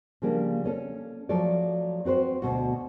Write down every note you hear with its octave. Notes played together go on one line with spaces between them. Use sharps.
C#3 F3 G3 A#3 D4
A#3 C#4 A4
F3 F#3 A3 A4 D5
C4 F#4 B4 C5
D2 B2 F#4